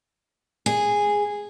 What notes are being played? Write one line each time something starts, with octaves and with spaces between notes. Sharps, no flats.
G#4